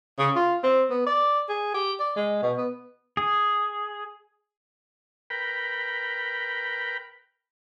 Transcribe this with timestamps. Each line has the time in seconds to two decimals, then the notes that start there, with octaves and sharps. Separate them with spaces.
0.18 C#3
0.36 F4
0.63 C4
0.90 B3
1.06 D5
1.49 G#4
1.74 G4
2.00 D5
2.16 G#3
2.42 B2
2.57 B3
3.17 G#4
5.30 A#4 B4 G5 B5